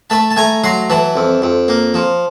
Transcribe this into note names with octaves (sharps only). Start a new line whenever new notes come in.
A3 A5 B5
A5
A3 G#5 A#5
F#3 A#5 C6
E3 A5 B5
F2
F2
A#3
F3